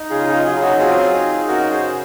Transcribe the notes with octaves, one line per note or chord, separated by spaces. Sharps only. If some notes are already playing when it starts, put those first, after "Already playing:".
Already playing: D#4
C#3 F4 G#4
F4
F#3 F4 G#4
D#4 F#4
C4 F4 G#4
D#4
F#2 F#4 A#4
G#4 C5
C#3